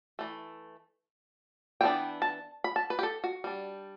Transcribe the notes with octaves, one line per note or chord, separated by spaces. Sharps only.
E3 A3
E3 B3 D4 G5
A5
B5
A5
B4
G4
A4
F#4
G3 D4